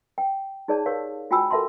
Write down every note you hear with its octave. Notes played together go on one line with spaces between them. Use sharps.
G5
D#4 G#4 C#5 D5 A5
G4 A#4 C#5 F5
F4 F#4 G5 G#5 B5 E6
A4 A#4 E5 F#5 A5 C6